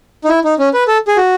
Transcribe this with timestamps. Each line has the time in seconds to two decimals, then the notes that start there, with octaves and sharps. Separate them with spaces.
0.24 D#4
0.29 E4
0.44 D#4
0.59 C#4
0.74 B4
0.88 A4
1.08 G#4
1.17 F#4